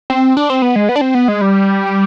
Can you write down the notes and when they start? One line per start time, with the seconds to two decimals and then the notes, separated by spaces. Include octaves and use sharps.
0.10 C4
0.37 D4
0.50 C4
0.62 B3
0.76 G#3
0.89 B3
0.96 D4
1.01 C4
1.15 B3
1.28 G#3
1.41 G3